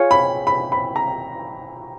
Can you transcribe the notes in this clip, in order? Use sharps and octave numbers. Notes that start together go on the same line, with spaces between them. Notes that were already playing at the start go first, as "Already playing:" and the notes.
Already playing: F4 G#4 C#5
B5
B5
B5
A#5